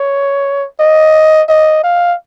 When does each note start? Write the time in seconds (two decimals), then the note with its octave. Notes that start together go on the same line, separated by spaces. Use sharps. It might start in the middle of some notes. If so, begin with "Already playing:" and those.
Already playing: C#5
0.80 D#5
1.49 D#5
1.84 F5